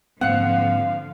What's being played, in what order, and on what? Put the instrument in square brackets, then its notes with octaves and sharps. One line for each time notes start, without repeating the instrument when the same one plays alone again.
[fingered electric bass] G#2 A#3 C4 [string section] D3 F3 [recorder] F5 [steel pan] F#5